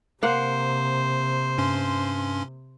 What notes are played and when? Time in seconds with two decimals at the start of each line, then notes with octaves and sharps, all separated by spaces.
0.23 C3 A#3 C5 F#5
1.58 G2 C#4 C6